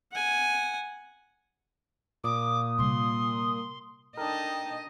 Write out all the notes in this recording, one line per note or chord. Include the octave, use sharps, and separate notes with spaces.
F#5 G#5
A#2 D6 D#6
C3 G3 C6
D4 D#4 A4 A#4 D#5 G5 A5